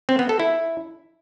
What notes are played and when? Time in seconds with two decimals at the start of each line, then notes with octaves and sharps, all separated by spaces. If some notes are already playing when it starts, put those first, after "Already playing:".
0.09 C4
0.19 B3
0.29 A4
0.40 E4